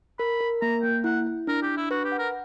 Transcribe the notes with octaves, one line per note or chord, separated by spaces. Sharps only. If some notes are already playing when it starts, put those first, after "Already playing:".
A#4 B5
A#4
A#3 A#5
A#3 G5
E4 F#5
E4
D4 A#4
G4
D4
E4
F#4 B4
G4
F#5
A#4